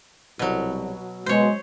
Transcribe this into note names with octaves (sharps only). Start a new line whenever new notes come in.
C2 B2 F#3
B2 G#3 C5 C#5